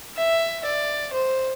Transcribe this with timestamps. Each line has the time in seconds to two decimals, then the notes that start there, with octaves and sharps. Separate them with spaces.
0.17 E5
0.65 D5
1.14 C5